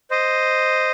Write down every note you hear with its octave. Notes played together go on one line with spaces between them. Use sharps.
C5 D#5